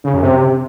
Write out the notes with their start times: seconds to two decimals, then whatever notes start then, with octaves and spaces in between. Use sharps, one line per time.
0.04 C#3
0.13 F#2
0.23 C3